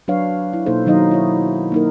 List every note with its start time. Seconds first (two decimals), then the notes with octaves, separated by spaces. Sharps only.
0.08 F#3 D4 B4 C#5 F5
0.53 E4
0.66 B2 A#3 D#4 A4 C5
0.86 D#3 F#3 D#4 D#5 F5
1.11 E4 C#5
1.72 A#3 D#4 A#4